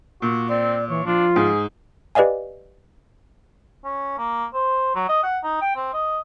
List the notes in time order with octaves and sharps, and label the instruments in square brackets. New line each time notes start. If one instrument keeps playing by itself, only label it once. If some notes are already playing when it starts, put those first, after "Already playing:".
[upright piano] A#2 [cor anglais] F#4
[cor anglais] C4 [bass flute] D5
[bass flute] E3 [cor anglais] C#5
[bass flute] F3 [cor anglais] D4 [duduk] F4
[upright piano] G#2 [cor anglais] G#4
[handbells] G4 B4 D5 D#5 F5 G#5
[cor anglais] C#4
A#3
C5
F#3
D#5
F#5
D#4
G5
C4
D#5